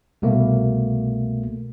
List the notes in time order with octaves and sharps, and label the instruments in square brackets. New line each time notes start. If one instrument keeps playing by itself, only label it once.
[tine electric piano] C2 B2 A3 A#3